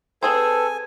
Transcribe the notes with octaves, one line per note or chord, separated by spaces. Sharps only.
C4 G#4 A4 B4 C5 G#5